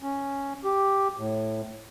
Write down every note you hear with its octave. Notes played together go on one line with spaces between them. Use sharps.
C#4
G4
A2